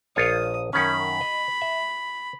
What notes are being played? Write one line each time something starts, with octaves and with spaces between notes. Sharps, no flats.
A#1 F4 C#5 D#6
F#2 D#3 C#4 B5
D#5
E5